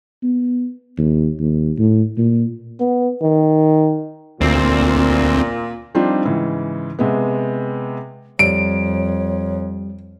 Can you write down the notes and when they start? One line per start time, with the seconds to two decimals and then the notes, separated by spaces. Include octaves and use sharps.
0.23 B3
0.98 D#2
1.39 D#2
1.78 A2
2.17 A#2
2.80 B3
3.22 D#3
4.41 D2 A#2 C4
5.95 F3 G3 C4 D4 D#4 F4
6.25 G#2 C#3 E3
6.99 C3 G#3 B3
8.39 F2 G3 C#5 D7